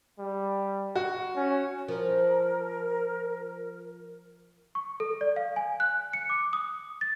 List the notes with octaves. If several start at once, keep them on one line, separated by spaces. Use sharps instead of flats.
G3
F#4
C#4
F3 A#4
C#6
A4
D5
F5
G#5
F#6
C#7
D6
D#6
A6